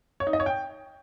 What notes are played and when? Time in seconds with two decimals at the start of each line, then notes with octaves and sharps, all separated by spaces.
0.20 C#5
0.27 D#4
0.33 D#5
0.40 C#5
0.46 G5